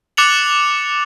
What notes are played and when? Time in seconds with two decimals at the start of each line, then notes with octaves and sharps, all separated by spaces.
0.17 D6 F#6 A6 C#7 F7 F#7